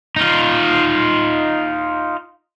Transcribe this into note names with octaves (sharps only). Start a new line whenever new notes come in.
D#4 F4